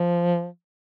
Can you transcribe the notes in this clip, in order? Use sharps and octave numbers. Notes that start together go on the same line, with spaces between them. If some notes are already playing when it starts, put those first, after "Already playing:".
Already playing: F3